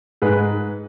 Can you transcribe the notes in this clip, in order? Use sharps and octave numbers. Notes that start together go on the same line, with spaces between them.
G#2 G#4 B4